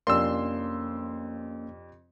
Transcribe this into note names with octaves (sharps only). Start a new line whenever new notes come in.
F2 C3 A#3 C#4 D4 C6 E6